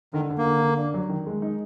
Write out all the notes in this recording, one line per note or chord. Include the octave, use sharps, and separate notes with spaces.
D3 D#3
D3
A#3
D3
D3
D4
F#3
D#3
G#3
D#4